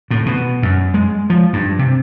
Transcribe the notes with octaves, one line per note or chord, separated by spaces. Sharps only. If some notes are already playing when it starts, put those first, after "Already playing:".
A2
B2
F#2
G#3
F3
G2
C3